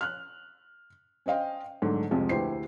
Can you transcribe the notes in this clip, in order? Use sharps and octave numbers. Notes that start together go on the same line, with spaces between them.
F6 F#6
C#4 C5 D#5 F5 G5
G#2 D3 F#3 A3
C2 F2 C3 F3 G#3
D2 E4 G4 B4 C5 C7